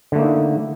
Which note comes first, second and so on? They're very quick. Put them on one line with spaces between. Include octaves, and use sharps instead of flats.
D3 A3 A#3 D#4 E4